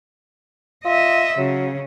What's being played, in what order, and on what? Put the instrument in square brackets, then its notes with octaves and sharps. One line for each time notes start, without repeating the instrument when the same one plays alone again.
[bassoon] F4 [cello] D#5 E5
[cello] C#3 [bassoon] F#3